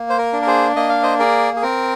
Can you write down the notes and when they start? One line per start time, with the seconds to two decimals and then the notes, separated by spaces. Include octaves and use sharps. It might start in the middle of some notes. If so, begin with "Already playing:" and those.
Already playing: A#3
0.10 C5
0.18 A#4
0.33 D4
0.42 A#4
0.47 G#4 C5
0.76 A#3 D#5
0.89 F5
1.03 C5 D#5
1.19 G#4 A#4 D5
1.56 G#4
1.62 C4 A#4